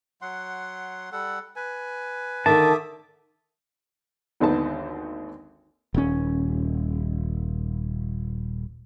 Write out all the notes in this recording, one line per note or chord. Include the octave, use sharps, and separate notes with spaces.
F#3 F#5 C6
G3 A4 F#5
B4 G#5
D3 D#3 E5 A5 D6 D#6
G#1 D#2 D3 B3 D#4 A5
D#1 C#4